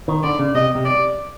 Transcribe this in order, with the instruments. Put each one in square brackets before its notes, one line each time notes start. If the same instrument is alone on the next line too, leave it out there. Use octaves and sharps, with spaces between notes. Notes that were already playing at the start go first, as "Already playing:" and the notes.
[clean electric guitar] D#3
[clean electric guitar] D3 [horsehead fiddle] D5
[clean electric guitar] C#3
[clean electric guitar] C3 [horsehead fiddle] D#5
[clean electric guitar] C3
[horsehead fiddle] D5